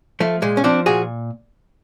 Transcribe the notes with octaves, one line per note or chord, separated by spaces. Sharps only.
F3 A3
A#2 G#3
C#4
F3 C4 D4
A#2 F#4 G#4